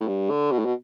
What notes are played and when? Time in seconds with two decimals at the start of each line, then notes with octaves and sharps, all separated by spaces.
0.01 A2
0.08 G2
0.30 D3
0.52 B2
0.59 A2
0.65 B2